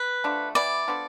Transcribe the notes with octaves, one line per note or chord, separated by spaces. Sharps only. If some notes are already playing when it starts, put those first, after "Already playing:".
Already playing: B4
D3 F3 A3 D4
E3 B3 E4 D5
F3 B3 D4 A4